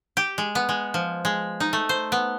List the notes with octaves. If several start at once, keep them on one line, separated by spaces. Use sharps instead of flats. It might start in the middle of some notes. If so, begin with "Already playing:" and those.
G4
G#3
B3
G#3
F3
G#3
D#4
A3
C5
B3